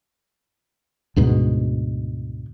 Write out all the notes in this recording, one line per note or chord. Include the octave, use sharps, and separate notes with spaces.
D2 G#2 B2